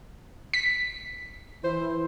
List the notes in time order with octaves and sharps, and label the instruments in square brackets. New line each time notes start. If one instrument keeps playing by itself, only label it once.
[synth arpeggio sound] B6
[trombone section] E3 E4 [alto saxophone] C5